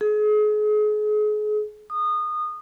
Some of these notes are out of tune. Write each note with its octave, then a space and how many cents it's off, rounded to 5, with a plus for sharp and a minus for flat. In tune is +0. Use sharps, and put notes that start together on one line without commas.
G#4 +35
D#6 -25